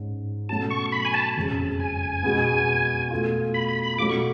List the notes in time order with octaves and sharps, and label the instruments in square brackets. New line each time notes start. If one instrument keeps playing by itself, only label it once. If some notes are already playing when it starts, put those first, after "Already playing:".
Already playing: [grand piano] G#2 G#3 C#4
[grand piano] B2 F#3 A3 C#4 F#4 [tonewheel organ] A5
[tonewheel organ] C#6
B5
G#5
A5
[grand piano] F#1 F2 C#3 G#3
[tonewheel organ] G#5
[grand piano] B2 G#3 B3
B2 A3 F4
[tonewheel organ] B5
B5
B5
[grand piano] B2 F#3 A3 F4 A4 [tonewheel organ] D6
[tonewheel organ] C#6